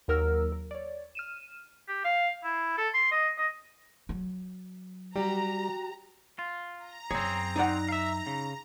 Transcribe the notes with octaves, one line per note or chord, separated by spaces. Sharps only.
D#2 F#3 A#4 E6 F6
A#4
C#5 D5
F6 D#7 E7
G4
F5
E4
A4
C6
D#5
D#5
F#3
G3 F#4 G4 A#5
F4
A#5
F#2 C4 G#4 C#5
D#4 D5 F#5
E5 F5
C#3